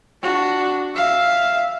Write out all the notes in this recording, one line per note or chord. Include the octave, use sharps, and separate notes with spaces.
D4 F#4
E5 F5